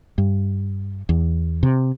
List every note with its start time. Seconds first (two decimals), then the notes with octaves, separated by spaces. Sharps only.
0.18 G2
1.09 E2
1.63 C3